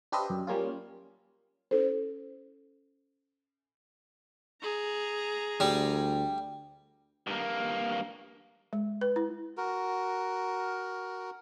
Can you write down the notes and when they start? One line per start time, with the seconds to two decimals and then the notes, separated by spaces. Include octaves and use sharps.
0.12 D4 G4 B4 C5 D#5 E5
0.30 F#2
0.47 G3 A#3 C#4 F4
1.71 C#4 E4 A4 C5
4.62 G#4 A#5
5.60 D2 G3
7.27 G2 A#3
8.73 G#3
9.01 B4
9.16 E4
9.57 F#4 A#4